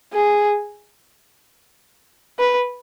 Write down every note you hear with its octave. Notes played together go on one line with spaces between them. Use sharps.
G#4
B4